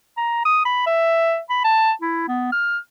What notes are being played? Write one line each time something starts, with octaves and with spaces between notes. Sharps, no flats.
A#5
D#6
B5
E5
B5
A5
E4
B3
F6